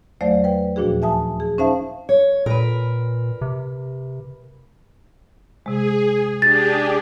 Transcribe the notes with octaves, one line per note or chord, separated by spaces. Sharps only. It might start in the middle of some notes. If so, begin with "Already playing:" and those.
E2 F#3 A3 C5 D5 F5
B4 G5
D#2 A#2 F3 D4 F#4 G#4
E5 G#5 A5 D#6
G#4
C#4 D#4 C5 E5 F5 A5
C#5
A#2 A#4 B4
C3
C3 G#3 G#4
D4 G4 G#4 A6